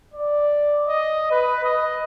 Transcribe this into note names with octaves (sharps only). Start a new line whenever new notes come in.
D5
D#5
B4
D#5